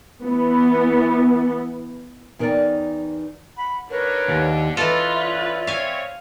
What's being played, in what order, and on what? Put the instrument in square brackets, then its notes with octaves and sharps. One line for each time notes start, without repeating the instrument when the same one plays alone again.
[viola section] E3 B3
[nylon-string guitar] E2 D#4 A#4 B4 D5 G5
[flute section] F#5 B5
[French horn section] G#2 D3 [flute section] A#4 B4 C#5
[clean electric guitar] D#2
[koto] E3 A4 [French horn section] C#4 B4 [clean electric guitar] F4 [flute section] D#5
[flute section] D5 E5
[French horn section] C4 C#5 [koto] F5 G#5